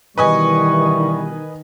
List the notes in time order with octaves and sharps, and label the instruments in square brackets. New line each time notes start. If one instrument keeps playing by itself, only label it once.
[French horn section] B2 E3 G3 [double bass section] D#3 [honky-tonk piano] B4 D#5 G#5 [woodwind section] C#6